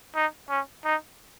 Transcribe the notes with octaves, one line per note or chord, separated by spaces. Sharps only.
D#4
C#4
D#4